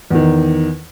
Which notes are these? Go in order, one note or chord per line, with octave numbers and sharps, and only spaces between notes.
E2 D#3